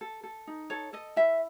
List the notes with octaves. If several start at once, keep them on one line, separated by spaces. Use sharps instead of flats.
A4
A4
D#4
A4 C#5
A4 D#5
E4 E5